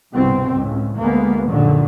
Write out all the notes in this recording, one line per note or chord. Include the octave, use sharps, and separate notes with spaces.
G1 C2 B2 C4
C#2 A2
D2 G#3 A#3 B3
A#1 F#2 A#2 D3 D#3